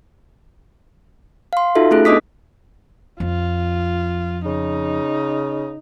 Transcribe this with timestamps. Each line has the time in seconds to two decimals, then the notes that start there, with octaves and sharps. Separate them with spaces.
1.53 F5 C6
1.75 D#4 F4 F#4 A4 E5
1.91 A3 C#4 D#4 G#4 A4 F#6
2.05 B3 D4 D#5 D6 D#6 B6
3.20 F2 F4
4.46 C#3 D#4